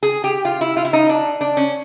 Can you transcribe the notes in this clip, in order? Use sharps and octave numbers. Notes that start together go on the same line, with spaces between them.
G#4
G4
F4
E4
F4
E4
D#4
D4
D4
C#4